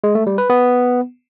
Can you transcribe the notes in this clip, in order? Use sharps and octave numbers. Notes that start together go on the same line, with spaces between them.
G#3
A3
G3
B4
B3